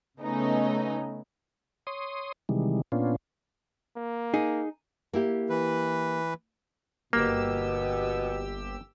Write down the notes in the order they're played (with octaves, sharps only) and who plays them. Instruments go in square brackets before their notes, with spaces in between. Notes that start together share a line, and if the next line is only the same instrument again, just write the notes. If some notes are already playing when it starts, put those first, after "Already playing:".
[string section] C#3 A3 B3 C#4 D#4
[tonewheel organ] C#5 C6 D#6
C3 D#3 E3 G3 G#3
A#2 B3 C#4 D4 F4
[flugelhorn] A#3
[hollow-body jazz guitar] D#4 G#4
[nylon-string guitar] A#3 E4 G4
[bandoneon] E3 B4
[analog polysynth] G1 G4 E6 [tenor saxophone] B2 [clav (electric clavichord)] A#3